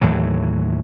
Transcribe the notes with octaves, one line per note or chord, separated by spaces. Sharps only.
D#2 A2 E3 F#3